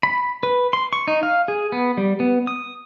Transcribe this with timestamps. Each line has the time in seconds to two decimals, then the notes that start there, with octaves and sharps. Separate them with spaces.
0.03 B5
0.43 B4
0.73 C6
0.93 C#6
1.08 D#4
1.23 F5
1.48 G#4
1.72 B3
1.97 G3
2.20 B3
2.47 D#6